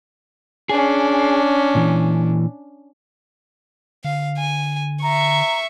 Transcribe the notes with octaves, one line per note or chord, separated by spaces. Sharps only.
C#4 D4 G#4
A#2 E3
D3 F5
G#5
E5 A#5 C#6